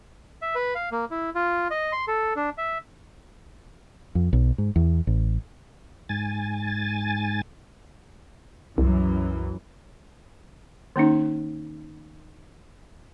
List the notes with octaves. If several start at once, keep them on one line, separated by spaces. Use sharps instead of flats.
E5
B4
F5
A#3
E4
F4
D#5
C6
A4
D4
E5
F2
B1
G#2
E2
A1
G#2 G#5 A6
C2 F#2 E3
D#3 A#3 C#4 D#4